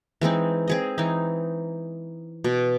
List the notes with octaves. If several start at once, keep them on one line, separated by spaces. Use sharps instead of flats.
E3 G#3 C4 D#4
C4 G#4 D#5
E3 D#4
B2